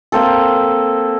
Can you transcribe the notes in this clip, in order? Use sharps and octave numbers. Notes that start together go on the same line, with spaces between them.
A#3 C4 A4